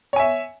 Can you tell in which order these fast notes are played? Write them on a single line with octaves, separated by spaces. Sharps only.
C#5 G#5 E5